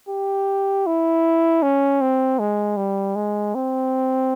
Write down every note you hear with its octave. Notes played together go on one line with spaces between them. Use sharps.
G4
E4
C#4
C4
G#3
G3
G#3
C4